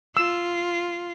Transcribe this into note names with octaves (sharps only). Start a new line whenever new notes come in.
F4 E6